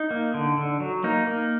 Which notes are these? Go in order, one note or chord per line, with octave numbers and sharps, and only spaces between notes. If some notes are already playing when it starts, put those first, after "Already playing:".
Already playing: D#4
A#3
D3
D3
F#3
A#3 D#4
A#3